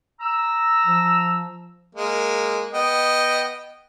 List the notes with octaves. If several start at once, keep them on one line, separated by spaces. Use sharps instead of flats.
A#5 E6
F3
G#3 A#3
B3 D#5 G5